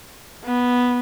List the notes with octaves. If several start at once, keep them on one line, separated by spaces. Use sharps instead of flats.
B3